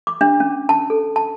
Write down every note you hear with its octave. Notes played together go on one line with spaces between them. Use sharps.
D6
D4
C#4
A5
A4
A5